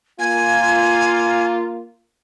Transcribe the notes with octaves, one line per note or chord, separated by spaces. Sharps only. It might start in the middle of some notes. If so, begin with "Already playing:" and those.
A#3 F4 G#5